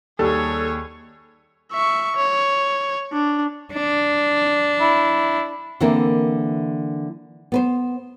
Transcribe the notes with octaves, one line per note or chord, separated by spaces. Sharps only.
D#2 G3 G#4 A4 C#5
E5 C#6
C#5
D4
D4
E4
D3 E3 A#3 C4 E4 A#4
B3 B4 C5